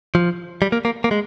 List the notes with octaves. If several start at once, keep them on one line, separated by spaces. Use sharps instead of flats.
F3
G3
A#3
A#3
A#3
G#3